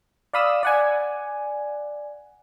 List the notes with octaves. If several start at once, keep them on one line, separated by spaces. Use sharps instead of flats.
D5 F5 B5 D#6 E6
D5 F#5 G#5